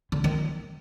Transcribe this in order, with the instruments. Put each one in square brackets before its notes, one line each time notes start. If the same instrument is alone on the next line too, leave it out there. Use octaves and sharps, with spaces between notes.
[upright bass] D3
D#3